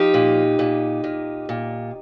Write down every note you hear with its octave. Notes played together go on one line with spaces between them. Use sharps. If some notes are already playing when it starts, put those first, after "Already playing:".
Already playing: F3 D#4 G4
A#2
A#2
A#2
A#2